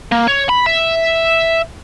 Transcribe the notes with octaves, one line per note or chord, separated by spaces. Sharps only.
A#3
C#5
B5
E5